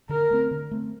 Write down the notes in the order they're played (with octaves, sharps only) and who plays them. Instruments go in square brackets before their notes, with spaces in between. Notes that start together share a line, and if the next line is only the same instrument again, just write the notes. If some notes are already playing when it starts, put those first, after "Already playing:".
[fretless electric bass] D3 [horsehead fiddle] A#4
[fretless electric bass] A3 C4
D3
A3 C4